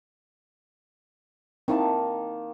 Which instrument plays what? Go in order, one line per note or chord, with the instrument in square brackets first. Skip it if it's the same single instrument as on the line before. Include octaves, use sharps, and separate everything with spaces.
[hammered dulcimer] D#3 A#3 A5 [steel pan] C4 D#4 E4